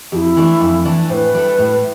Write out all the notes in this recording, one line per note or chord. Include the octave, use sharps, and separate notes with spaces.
F2 E4 G4
E3 A3 D4
F2
E3 A3 D4
A2 B4 C5
G3 D4 A4
A2